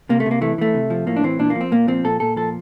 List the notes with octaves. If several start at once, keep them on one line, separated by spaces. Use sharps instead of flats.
C3 A#3
A3
C3
A#3
E3 A3
E3 A3
C3
F3
A2 A#3
D4
E3 C4
A#2 D4
A#3
F3
C4
A#2 A#3
F3 C4
A#2 A4
A#2 A4
F3 A4